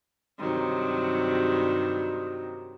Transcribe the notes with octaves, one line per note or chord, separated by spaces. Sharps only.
G2 C3 D#3 F#3